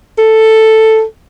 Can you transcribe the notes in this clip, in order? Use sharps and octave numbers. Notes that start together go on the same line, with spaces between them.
A4